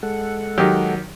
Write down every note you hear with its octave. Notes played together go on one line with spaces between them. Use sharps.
G#3 A4 F#5
D#3 F#3 G4